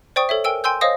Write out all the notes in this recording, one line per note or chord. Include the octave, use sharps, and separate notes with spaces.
C5 D5 G5 C#6 D#6
A4 C#5 E5
A#4 G5 G#5 E6 D7
G5 G#5 C6 E6 G6
C5 C#5 D#5 F5 D#6 A#6